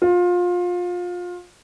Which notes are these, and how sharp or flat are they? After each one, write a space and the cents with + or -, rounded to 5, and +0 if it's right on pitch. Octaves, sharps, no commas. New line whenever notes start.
F4 +25